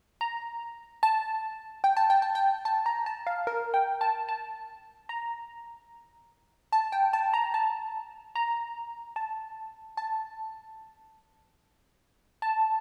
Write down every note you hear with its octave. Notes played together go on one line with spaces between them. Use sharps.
A#5
A5
G5
A5
G5
A5
G5
A5
A#5
A5
F5
A#4
G5
A5
A5
A#5
A5
G5
A5
A#5
A5
A#5
A5
A5
A5